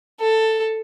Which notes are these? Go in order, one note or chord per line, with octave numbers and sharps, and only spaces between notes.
A4